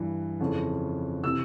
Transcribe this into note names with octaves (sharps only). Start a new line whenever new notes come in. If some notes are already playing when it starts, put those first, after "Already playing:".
Already playing: G2 E3
F2 C#3 E3
C3 E3 E6